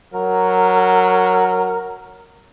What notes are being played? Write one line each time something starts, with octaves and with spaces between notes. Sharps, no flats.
F#3 A#4